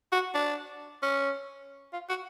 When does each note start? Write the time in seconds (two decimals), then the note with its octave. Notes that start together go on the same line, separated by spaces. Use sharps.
0.12 F#4
0.34 D4
1.02 C#4
1.93 F4
2.09 F#4